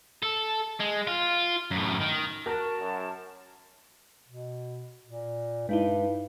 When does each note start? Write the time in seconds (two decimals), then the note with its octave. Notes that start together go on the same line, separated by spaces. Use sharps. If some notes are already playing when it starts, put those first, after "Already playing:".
0.23 A4
0.80 G#3
1.07 F4
1.71 F#2 A2
2.01 D#3
2.46 F#4 A#4 A5
2.80 F#2
4.29 B2
5.05 A#2
5.69 G2 G#3 D#4 E4